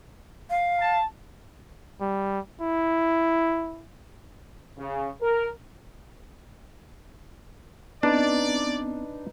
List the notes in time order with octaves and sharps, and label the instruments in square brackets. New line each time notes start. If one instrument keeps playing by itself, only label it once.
[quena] F5
[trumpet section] A5
[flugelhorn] G3
E4
[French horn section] C#3
A#4
[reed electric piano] B3 C4 [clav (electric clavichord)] D4 [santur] D#4 B4 [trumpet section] D5